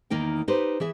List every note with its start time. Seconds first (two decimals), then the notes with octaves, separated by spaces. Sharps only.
0.10 E2 D#3 A#3 D#4 G5
0.48 D#4 G4 B4 C5
0.80 E3 G#4 E5